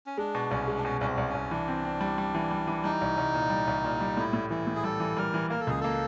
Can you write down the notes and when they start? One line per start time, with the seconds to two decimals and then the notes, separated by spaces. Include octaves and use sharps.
0.06 C#4
0.17 G#3 D4
0.35 B2
0.51 C2 C#4
0.67 G#3
0.78 D4
0.84 B2 C#4
1.01 C2 C#4
1.07 C4
1.18 C2
1.28 C#4
1.35 C2
1.51 E3 D4
1.68 C4
1.85 C4
2.01 G3
2.18 G3
2.35 E3
2.51 G3
2.68 E3
2.84 G3 D#4
3.01 C2
3.17 C2
3.34 A#2
3.50 G3
3.67 C2
3.84 A#2
4.01 G3
4.17 A2 E4
4.33 A2
4.50 E3 E4
4.67 A2
4.76 G#4
4.84 G3 A4
5.00 E3
5.17 G3 A#4
5.34 E3
5.50 A#3 A#4
5.60 A4
5.67 C#2 G#4
5.81 A#3 A4